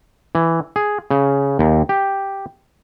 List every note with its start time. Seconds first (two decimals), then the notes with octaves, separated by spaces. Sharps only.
0.35 E3
0.76 G#4
1.11 C#3
1.59 D#2
1.89 G4